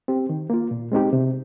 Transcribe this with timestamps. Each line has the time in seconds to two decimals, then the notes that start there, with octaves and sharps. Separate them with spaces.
0.08 C4 G4
0.29 D#3
0.50 A#3 F4
0.71 A#2
0.92 G#3 C4 D#4 G4
1.13 C3